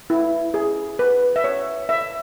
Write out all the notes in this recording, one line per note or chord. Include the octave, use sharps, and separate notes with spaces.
E4
G#4
B4
E5
C#5
E5